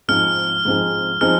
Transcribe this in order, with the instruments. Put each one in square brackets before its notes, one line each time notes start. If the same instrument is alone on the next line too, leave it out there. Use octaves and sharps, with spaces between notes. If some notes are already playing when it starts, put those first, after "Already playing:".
[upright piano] G#2 F3 C4 D#4 G#4 [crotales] F6
[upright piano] G#2 F3 C4 D#4 G#4
[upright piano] F3 C4 D#4 G#4 [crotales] F6